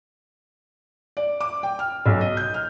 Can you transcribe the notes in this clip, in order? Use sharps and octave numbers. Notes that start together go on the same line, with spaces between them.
D5
D6
G5
F6
B1
D#5
G6
F6